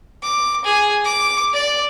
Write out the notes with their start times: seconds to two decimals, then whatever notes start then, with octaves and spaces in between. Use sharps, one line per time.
0.23 D6
0.65 G#4
1.05 D6
1.53 D5